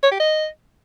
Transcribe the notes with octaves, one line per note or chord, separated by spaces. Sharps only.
C#5
G4
D#5